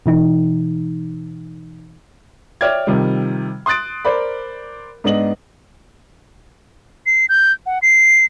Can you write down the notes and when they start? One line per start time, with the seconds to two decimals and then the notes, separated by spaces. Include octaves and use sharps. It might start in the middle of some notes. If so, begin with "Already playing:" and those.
0.06 B2 E3 D#4
2.61 C#5 D5 E5 G5 F6 G#6
2.87 C3 D#3 F3 G3
3.66 C6 D#6 F#6 A6 D7
4.05 A#4 C5 D5 B5
5.04 G#2 B3 D4 D#5 F#7
7.06 C7
7.29 G6
7.66 F#5
7.82 C7